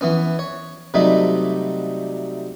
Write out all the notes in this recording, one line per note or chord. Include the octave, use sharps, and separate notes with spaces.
E3 B3 C#4
C#5
C3 F#3 G3 A3 D#4 B5